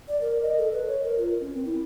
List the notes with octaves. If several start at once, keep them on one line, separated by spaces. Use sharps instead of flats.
D5
A#4
D#5
A4
B4
C#5
A#4
F4
C#4
C4
E4